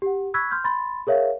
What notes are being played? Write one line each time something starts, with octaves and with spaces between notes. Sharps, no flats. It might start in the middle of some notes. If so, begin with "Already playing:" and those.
G4 F#5
B5 C#6 E6 F#6 G#6 B6
C6 F6 G6
B5 C6 A6
G#4 A#4 C#5 E5 F5